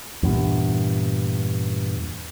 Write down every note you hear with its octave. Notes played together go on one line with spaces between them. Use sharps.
E2 G2 A#2